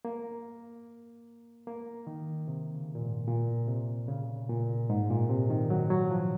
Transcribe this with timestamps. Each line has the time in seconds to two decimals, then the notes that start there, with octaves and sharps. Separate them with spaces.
0.05 A#3
1.67 A#3
2.07 D#3
2.48 C3
2.75 C#3
2.95 A#2
3.01 G#2
3.28 A#2
3.68 C3
4.08 C#3
4.50 A#2
4.90 G#2
5.10 A#2
5.30 C3
5.50 D#3
5.70 F#3
5.90 F#3
6.10 F3